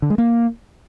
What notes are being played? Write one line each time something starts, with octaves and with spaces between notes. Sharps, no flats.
D3
G#3
A#3